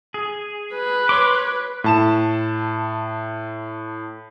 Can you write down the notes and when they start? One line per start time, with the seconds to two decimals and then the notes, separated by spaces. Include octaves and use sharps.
0.14 G#4
0.74 B4
1.09 C#5 C6 D6
1.84 A2 A5 E7